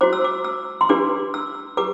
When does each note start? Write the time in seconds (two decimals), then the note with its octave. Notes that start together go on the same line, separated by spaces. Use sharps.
0.01 F#4 C5 D6
0.13 E6
0.24 D6
0.44 E6
0.81 C6
0.89 D4 G4 B4 D6
1.34 E6
1.77 G4 B4 D6